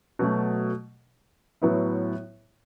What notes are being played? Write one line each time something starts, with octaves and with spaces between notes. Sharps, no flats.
B2 F#3 A3
A2 F#3 B3 E4